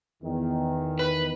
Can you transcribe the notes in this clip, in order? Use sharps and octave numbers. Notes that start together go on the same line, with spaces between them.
E2 D#3
B4